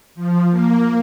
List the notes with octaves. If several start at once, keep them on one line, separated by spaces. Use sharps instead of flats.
F3
A#3